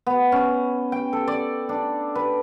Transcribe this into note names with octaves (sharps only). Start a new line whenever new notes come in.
B3
C#4
G5
A4
D5
D4
B4